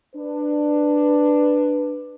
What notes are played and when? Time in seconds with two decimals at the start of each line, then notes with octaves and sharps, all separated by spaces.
0.16 D4 B4